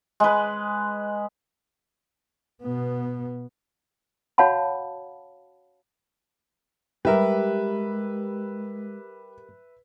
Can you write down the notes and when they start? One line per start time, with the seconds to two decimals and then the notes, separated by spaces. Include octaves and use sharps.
0.20 G#3 B4
2.63 B2 B3
4.38 F#4 C#5 F5 F#5 A5 B5
7.05 G3 G#3 G4 A#4 B4 E5